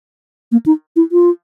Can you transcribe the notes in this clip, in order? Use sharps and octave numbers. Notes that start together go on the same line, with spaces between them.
A#3
D#4
E4
F4